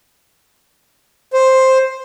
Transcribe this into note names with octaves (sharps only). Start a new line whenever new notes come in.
C5